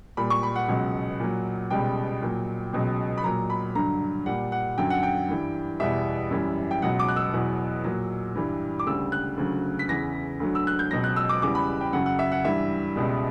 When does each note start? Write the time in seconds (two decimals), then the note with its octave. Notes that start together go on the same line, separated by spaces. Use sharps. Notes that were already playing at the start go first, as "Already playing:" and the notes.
0.17 A#2 G3 B5
0.30 C#6
0.43 B5
0.56 F#5
0.68 C#2 B2 F#3
1.20 A#2 F#3
1.71 C#2 B2 G3 G5
2.22 A#2 F#3
2.73 C#2 B2 F#3
3.18 B5
3.24 A#2 F#3 A#5
3.50 B5
3.75 G2 D3 F#3 A#5
4.26 A#2 G3 F#5
4.52 F#5
4.78 F#2 D3 F#3 G5
4.90 F#5
5.03 G5
5.28 G2 E3 G3
5.80 E2 B2 G3 E5
6.31 F#2 E3 G3
6.71 G5
6.82 C#2 B2 F#3 F#5
6.99 D6
7.09 F#6
7.16 E6
7.33 E2 B2 F#3
7.84 A#2 F#3
8.35 G2 E3 G3
8.79 D6
8.87 D2 C#3 G3 E6
9.12 F#6
9.37 D2 C#3 F#3
9.79 B6
9.89 E2 C#3 E3 A#6
10.40 D2 D3 F#3
10.55 E6
10.67 F#6
10.79 G6
10.91 C#2 B2 F#3 A#6
11.04 F#6
11.16 E6
11.29 D6
11.42 E2 C#3 G3 D6
11.55 B5
11.81 G5
11.93 F#2 C#3 F#3 F#5
12.06 F#5
12.19 E5
12.32 F#5
12.44 G2 E3 G3 E5
12.96 C#2 B2 G3